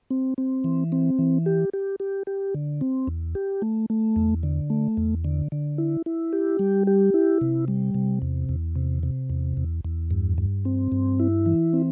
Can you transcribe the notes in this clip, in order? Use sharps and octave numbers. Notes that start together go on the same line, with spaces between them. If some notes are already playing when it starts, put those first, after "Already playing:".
C4
C4
E3
C4
E3
G4
G4
G4
G4
D3
C4
E2
G4
A3
A3
E2
D3
A3
E2
D3
D3
E4
E4
G4
G3
G4
E4
C3
G3
C3
E2
E2
C3
C3
E2
E2
E2
G2
G2
C4
G2
E4
E3
C4